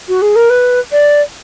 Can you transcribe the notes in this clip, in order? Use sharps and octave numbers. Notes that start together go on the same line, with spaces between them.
F#4
G#4
A#4
B4
D5